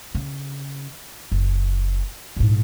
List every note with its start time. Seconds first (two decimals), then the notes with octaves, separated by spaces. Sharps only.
0.15 C#3
1.32 F#1
2.37 A#1 G#2